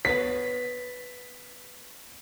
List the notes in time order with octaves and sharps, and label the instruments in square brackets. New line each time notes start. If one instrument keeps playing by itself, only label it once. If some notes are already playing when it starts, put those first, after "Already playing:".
[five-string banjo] B3 B4 C#5 [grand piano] B6